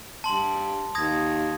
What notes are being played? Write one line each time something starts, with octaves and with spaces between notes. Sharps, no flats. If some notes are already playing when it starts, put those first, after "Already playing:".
G2 A5 C6 F#7
D#2 D#6 G#6 A#6